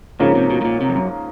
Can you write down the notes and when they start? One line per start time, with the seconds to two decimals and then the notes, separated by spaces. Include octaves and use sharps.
0.19 G#2 C#3 F3 A#3 C#4
0.35 C3
0.50 B2
0.61 A2
0.65 A#2
0.81 C3
0.89 F2
0.95 F#2